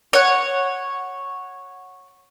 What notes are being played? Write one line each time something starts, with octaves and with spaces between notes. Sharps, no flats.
C#5 F#5